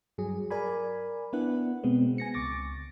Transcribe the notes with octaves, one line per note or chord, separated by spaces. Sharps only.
G2 F#3 G#4
A#4 D5 G#5 B5
B3 D4 E4 B4 F#5
B2 G#3 B3 C4
G#5 A#6 C#7
C#2 C#6 D6 A6 A#6